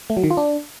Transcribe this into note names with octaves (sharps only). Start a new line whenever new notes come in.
A3
F#3
D#3
F4
D4